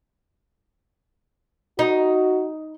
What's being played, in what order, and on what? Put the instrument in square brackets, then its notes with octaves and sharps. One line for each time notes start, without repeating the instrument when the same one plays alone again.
[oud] D#4 [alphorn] F#4